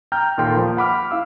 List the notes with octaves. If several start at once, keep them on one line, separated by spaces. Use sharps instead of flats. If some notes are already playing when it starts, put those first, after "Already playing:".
G5 A#5 F6 G6
D#2 A#2 A4 G5 C6
F3 A#3
F#5 B5 D6 F6
E4 F5 E6